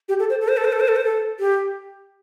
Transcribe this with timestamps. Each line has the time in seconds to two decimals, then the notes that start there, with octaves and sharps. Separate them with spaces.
0.09 G4
0.19 A4
0.30 C5
0.41 A4
0.48 C5
0.57 A4
0.65 C5
0.72 A4
0.80 C5
0.88 A4
0.96 C5
1.05 A4
1.39 G4